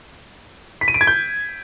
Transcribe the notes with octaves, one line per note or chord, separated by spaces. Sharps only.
B6
D#7
D7
G#6
G6